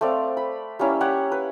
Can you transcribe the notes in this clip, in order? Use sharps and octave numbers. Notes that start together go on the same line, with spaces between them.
A3 C4 D5 F5
B5
G3 A#3 C#4 E4
G4 C#5 F#5
B4